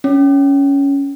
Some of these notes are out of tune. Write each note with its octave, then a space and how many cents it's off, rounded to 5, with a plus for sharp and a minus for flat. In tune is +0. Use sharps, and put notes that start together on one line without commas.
C#4 +10